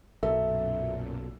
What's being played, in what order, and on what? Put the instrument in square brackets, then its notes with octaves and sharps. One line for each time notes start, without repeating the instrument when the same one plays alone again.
[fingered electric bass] B1 [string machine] F#2 A#2 [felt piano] A4 [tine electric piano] E5